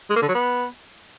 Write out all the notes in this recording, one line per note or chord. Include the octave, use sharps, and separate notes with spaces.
G#3
A#3
D3
F#3
B3